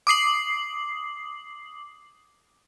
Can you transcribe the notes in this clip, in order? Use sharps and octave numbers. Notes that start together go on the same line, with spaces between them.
D6 D#6 C7 F#7